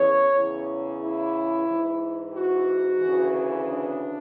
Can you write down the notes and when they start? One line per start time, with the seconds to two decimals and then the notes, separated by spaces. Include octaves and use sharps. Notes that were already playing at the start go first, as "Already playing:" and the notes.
Already playing: E2 C#3 E3 C#5
0.35 E2 C#3 E3
1.01 E4
1.68 G#2 E3
2.34 F#4
3.01 D2 C#3 E3
3.68 D4